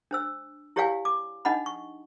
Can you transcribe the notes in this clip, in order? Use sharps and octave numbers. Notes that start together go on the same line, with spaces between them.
D4 C5 E6
E4 G4 C#5 D5 F5 G#5
D6
D4 D#4 D#5 F#5 B5
C#6